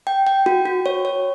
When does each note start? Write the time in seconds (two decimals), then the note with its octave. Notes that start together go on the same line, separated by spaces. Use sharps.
0.07 G5
0.27 G5
0.46 F#4
0.66 F#4
0.86 C#5
1.05 C#5